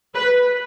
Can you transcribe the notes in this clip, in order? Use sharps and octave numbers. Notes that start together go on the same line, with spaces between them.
B4